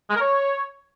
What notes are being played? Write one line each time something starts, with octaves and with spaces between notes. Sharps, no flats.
G#3
A#4
C#5